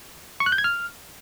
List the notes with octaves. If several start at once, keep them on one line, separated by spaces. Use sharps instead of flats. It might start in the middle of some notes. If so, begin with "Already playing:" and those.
C#6
F#6
G6
G#6
F6